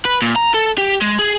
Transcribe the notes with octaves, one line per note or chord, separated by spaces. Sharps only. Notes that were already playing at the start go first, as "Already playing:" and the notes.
B4
A#2
A#5
A4
G4
G#3
G#4